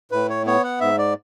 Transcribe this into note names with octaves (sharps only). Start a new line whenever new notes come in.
A2 B4
C#5
B3 C#5
F#5
G#2 E5
D5